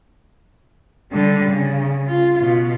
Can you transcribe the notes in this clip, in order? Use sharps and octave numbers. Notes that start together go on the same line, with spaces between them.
D3 G3
C#3
F4
B2